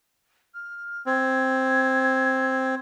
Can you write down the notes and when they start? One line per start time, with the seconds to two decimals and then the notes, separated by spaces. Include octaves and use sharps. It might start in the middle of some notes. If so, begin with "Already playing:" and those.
0.54 F6
1.06 C4 G#6